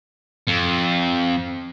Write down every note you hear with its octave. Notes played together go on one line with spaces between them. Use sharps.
F2